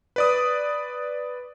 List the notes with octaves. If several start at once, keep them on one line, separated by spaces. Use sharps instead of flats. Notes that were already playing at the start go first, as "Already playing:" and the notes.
B4 D5 D#6